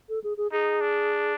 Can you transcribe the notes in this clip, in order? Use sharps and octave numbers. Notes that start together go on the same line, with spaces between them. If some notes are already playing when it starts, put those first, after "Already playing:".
A4
G#4
G#4
D#4 G#4
D4